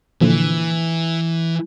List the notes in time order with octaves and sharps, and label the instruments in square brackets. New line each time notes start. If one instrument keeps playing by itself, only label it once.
[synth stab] A#2 D3 F3 [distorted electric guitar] E3